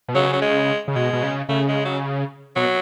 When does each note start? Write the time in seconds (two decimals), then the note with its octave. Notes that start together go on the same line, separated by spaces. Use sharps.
0.08 B2
0.15 C#3 F#3
0.33 F#3
0.42 G#3
0.88 C#3
0.95 B2 G#3
1.13 B2
1.23 C#3
1.49 C#3 A3
1.68 G#3
1.85 F#3
2.56 B2 F#3